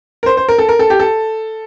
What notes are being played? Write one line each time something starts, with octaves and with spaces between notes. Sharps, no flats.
A#4
C5
C5
A#4
A4
A#4
A4
G4
A4